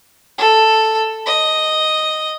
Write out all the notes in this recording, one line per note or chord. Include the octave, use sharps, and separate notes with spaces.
A4
D#5